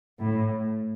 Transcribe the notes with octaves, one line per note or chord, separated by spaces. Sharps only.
A2